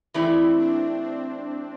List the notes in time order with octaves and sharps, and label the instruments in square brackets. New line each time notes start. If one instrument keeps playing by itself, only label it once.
[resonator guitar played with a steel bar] E3 A3 E4 G4 D5 [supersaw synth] C4
[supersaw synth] D4
C4